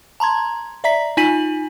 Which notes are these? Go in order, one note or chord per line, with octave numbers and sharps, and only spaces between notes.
A5 A#5 C6 G#6
D5 E5 A#5 B6
D#4 F4 G#5 B6 D#7 F#7